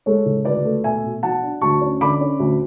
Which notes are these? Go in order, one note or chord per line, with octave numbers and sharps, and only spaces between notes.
G#3 A4 C#5
C#2
D2 B4 D5
A3
B2 E5 G#5
B2
F#3 F#5 A5
D4
D2 A5 C#6
C#4
D3 B5 D6
C#4
D2